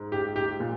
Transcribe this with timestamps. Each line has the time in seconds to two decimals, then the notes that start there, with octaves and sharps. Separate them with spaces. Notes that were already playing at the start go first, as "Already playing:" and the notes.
Already playing: G#2
0.12 G4
0.36 G4
0.60 A#2